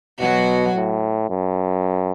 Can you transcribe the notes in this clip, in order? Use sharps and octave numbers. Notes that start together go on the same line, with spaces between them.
B2 F#3 F#4
A2
F#2